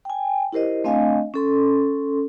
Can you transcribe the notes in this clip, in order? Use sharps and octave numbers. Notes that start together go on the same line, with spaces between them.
G5 G#5
E4 G4 A#4 C5 D#5
A3 C4 D4 D#5 F5 G#5
C#4 A4 C6